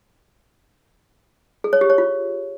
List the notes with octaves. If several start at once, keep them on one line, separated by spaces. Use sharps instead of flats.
G#4
C#5
G4
C#5
F4